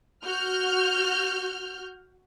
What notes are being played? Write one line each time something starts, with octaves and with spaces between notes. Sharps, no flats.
F#4 F6 G6